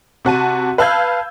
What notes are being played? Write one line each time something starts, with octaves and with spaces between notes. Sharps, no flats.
C3 F#4 A5 D#7
B4 F5 A5 E6 G6 G#6